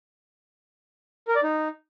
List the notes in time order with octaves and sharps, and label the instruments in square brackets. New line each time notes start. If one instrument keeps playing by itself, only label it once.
[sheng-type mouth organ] A#4
D5
D#4